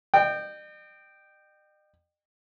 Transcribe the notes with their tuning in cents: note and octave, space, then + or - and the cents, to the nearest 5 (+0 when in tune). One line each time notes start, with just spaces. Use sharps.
D#5 -45 G5 -5